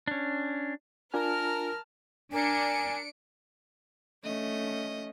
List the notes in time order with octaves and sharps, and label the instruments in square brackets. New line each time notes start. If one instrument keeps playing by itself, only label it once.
[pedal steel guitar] C#4 D4
[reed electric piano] D4 F4 G#5 [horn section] A#4 [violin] A5 F6
[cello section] D4 [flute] A#4 [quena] G#5 [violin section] C#7 D7
[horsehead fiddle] A3 C#4 [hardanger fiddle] D#5